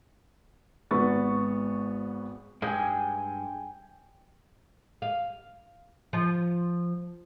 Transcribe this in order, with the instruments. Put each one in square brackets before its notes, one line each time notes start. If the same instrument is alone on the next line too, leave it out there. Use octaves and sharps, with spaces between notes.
[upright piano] G#1 G#2 B3 C#6 A6
[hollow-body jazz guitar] G2 G#3 [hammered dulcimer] G5 G#5
[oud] F5
F3